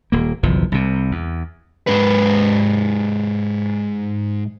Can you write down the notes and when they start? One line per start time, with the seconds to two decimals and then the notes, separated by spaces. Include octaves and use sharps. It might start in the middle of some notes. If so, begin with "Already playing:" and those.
0.12 D#1 A#3
0.43 F#1 B1 E2 F3
0.72 C2 C3
1.11 E2
1.87 G#2 B4